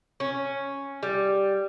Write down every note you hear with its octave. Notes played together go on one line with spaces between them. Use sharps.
C#4
G3